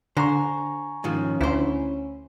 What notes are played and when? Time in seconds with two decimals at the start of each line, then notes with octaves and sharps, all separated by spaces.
0.17 D3 C5 G#5 A#5 C#6
1.04 G#2 D#3 F3 C#4
1.41 D2 E4 C5